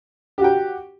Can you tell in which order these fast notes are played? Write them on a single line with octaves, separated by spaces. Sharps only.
G4 F#4 G5